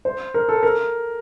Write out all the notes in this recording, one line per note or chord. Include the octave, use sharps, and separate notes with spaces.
C5
A#4
A4
A#4